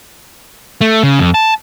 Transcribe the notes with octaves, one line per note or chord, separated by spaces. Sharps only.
A3
C#3
F2
A5